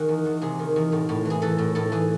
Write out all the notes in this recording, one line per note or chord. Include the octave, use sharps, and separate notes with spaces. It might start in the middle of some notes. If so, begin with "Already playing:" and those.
Already playing: D#3 F#4 G#4
E2
E2
C3 G#4
D#3
E2
A2
A2
E3 G#4
E3 A4
A2
A2 A4
E3 G#4